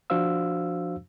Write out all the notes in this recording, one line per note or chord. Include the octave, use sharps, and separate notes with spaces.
F3 D4 F#4 C5 F5 E6